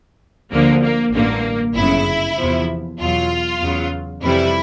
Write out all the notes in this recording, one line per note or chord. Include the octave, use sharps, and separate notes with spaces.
D2 D3 F3 A#3
A#3
A1 G2 D3 A#3
G1 F#2 C#3 E4
E2 C3 F3
E2 B2 F#3 F4
E2 C#3 F#3
F2 C3 E3 G3 E4